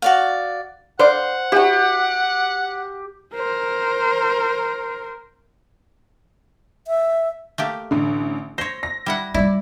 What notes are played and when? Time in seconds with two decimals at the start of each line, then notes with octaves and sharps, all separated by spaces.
0.02 F#4 D5 F5
0.99 C5 D5 F5 F#5
1.52 E4 F#4 G4
3.34 A#4 C5
6.87 E5
7.58 A3 A#3 G4
7.91 A1 D3
8.58 C5 C#5 A#6
8.83 A#6
9.06 G3 E4 F#5
9.34 G3 C#4 E4 D5